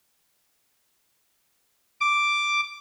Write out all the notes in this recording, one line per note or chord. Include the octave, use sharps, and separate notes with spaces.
D6